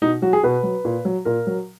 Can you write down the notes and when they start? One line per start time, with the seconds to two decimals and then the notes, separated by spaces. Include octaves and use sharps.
0.02 B2 D#4
0.22 F#3 F#4
0.33 G#4
0.43 B2 B4
0.63 F#3
0.85 A#2
1.05 F#3
1.25 A#2 A#4
1.47 F#3